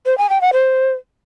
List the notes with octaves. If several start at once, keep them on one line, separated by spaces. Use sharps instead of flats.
C5
G#5
G5
F#5
C5